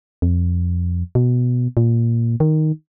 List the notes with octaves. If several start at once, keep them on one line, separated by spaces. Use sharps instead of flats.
F2
B2
A#2
D#3